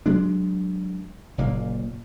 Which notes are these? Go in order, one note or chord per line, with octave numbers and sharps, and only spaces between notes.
F#3 G#3 D4
F#1 A#2 A#3